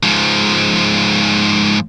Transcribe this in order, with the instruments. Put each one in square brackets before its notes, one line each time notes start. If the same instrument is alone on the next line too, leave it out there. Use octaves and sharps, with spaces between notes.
[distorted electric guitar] G#2 F3